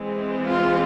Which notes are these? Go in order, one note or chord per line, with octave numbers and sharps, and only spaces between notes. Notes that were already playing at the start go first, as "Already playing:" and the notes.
Already playing: E3 G#3 C4
F4